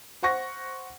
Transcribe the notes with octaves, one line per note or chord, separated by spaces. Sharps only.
C5 F#5 C#6 A#6